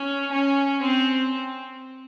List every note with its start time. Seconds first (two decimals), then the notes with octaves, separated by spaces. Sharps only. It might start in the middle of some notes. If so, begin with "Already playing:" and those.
Already playing: C#4
0.32 C#4
0.82 C4